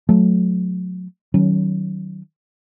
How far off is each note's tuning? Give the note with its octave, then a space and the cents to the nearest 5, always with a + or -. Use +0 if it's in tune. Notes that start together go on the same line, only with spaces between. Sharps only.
F#3 -25 A3 -25
D#3 +0 F#3 +20 C#4 +0